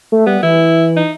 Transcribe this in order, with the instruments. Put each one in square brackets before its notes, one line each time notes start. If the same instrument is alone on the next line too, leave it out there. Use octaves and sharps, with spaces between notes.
[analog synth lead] A3
[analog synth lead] G3 [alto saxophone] B3
[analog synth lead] E3 [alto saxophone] E4
[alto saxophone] D#4